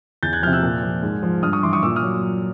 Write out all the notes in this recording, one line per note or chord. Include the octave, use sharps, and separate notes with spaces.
E2 G6 A6
F#6 G#6
C3 F3 F6 G6
E6 F#6
A#2
F3
G#2
F3
G2 D#6 F6
C#6 D#6
E3 C6 D6
C#6 D#6
A#2 D6 E6
D#6 F6
F#3